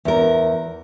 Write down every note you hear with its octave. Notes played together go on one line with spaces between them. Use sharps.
E2 A#4